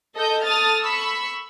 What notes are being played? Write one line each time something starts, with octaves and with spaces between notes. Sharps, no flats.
A4 D#5 G6
A4 D#6 F6 A6
B5 C#6 E6